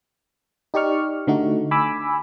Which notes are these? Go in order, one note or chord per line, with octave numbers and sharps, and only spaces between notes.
D#4 G4 D5 C#6 F6
D3 A3 D#4 F#4
G#5 B5 D6 E6